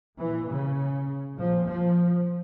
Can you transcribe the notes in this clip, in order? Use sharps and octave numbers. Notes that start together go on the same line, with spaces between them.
A#2 E3
C#3
A#2 F3
F3